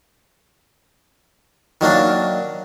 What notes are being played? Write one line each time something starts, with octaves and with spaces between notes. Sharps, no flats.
D#3 F#3 A#3 D4